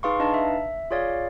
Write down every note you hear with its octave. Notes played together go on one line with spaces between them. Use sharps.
D#4 G#4 B4 F5 C6 C#6
D4 D#4 B4 D#5 F5 A5
E5
F4 G#4 C#5 D5 F5